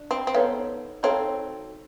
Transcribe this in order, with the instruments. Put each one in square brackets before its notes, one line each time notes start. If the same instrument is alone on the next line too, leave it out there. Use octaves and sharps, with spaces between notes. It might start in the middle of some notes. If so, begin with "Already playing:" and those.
Already playing: [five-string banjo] D4
[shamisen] C4
C4
[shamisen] B3 [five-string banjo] D#4 F#4 A4 C#5 F5
[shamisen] C4 [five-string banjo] D#4 F#4 A4 C#5 F5